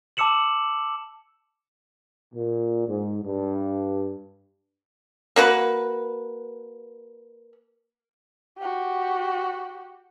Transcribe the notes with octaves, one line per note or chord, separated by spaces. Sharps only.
A5 D6 E6 C#7 E7 F#7
A#2
G#2
G2
A#3 F#4 B4
F#4 G4